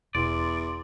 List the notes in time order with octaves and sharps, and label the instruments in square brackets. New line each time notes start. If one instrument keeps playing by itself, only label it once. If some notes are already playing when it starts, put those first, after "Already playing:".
[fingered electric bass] E1 [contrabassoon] E2 [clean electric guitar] D5 [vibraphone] C6